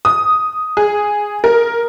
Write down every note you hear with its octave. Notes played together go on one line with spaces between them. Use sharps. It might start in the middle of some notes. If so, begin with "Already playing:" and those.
D#6
G#4
A#4